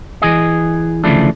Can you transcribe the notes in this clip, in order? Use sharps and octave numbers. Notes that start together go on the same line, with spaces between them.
E3 G#4 D#5
D2 C#3 E3 F3 A3 D4